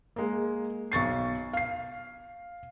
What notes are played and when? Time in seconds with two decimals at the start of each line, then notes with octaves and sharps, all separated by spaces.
0.16 G#3 A#3
0.92 B1 C#6 A6 C7
1.53 F5 C7